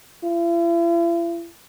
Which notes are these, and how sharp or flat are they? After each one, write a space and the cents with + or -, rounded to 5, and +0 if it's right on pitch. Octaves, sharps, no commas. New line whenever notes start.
E4 +45